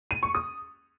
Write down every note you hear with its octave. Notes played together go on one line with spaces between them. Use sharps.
D#7
C#6
D#6